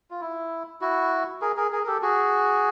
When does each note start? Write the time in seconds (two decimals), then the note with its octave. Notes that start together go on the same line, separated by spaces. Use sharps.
0.11 F4
0.21 E4
0.81 E4 F#4
1.41 G#4 A#4
1.57 G#4 A#4
1.72 G#4 A#4
1.83 A#4
1.87 G4 A4
2.02 F#4 G#4